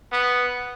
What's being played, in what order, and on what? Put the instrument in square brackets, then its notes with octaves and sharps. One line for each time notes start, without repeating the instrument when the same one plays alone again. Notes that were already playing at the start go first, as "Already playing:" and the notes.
[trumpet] B3